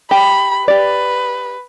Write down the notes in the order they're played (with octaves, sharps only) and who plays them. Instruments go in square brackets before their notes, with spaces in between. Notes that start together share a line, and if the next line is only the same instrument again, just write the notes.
[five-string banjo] G4 [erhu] B5
[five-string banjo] G4 D5 [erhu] B4